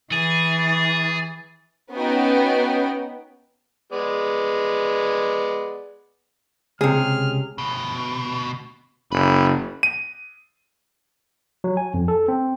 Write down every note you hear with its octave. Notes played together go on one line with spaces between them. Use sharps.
E3 G#4 A6
B3 C#4 D#4 F#4 G5
G#3 B3 D5
C#2 C3 G#4 F6
D2 B2
F#1 B4
D#7
F#3
G#5
F2
A4
C4